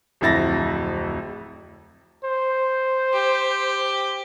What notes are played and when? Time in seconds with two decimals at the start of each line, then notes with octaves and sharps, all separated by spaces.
0.21 D1 F2 E4 A6 A#6
2.24 C5
3.13 G4